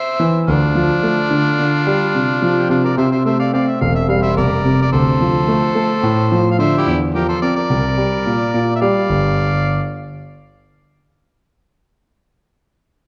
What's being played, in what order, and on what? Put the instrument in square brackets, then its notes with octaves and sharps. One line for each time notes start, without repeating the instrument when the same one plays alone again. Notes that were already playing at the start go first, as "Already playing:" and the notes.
Already playing: [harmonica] C5 E5
[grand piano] E3
[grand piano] D2 [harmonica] D4 F4
[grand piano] F3
A3
D3
D3
G3
C3
F3
[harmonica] G4
[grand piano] C3 [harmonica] D4 F4
[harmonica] A#4 D5
[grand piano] C3 [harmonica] C5 E5
[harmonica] C5 E5
[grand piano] A3 [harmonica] C5 E5
[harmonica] D5 F5
[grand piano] C4 [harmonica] D5 F5
[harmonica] E5
[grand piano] E1 [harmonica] F5
[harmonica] E5
[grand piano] G3 [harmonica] F5
[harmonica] C5 E5
[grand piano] F1 [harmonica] A#4 D5
[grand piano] C3
[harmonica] D5
[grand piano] D2 [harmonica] A4 C5
[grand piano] F3
A3
A3
A2
F3
[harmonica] F5
[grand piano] D3 [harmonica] C5 E5
[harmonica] E4 G4
[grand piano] E2
[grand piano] F3 [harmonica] G4 A#4
[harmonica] A4 C5
[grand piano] C4 [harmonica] A#4 D5
[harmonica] A#4 D5
[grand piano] C2
G3
A#2
A#2
[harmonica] E5
[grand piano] G3 [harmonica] D5 F5
[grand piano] G1